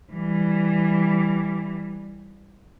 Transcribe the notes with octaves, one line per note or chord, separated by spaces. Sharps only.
E3 G3